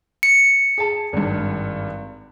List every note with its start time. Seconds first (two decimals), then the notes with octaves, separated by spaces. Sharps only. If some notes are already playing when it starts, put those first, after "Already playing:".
0.23 C#7
0.78 G#4 A5
1.13 G#1 G2